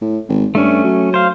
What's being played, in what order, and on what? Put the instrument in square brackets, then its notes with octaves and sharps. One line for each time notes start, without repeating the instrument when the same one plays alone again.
[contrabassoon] A2
G#1
[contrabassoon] G2 [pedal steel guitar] A3 C#4
[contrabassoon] F#3
[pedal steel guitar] C5 F5